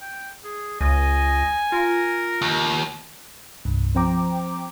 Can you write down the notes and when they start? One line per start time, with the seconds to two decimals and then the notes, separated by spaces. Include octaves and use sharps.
0.01 G5
0.44 G#4
0.81 C#2 D#5 G#5
1.72 F4 A#4
2.42 D#2
3.65 C2 G2
3.95 F3 C4 C5 G5 A#5 D6